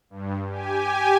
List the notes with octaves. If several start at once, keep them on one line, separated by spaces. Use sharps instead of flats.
G2
G4 G#5